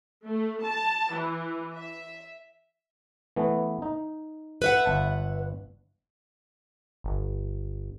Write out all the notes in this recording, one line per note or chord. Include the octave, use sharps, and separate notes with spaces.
A3
A5
E3
E5
E3 A3 B3
D#4
B4 E5 F#5
G1 A5
G1